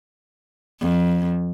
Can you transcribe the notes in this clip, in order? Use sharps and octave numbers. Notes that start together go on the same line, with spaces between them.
F2